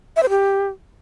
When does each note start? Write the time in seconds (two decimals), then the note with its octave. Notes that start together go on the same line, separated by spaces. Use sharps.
0.16 E5
0.23 C5
0.29 G4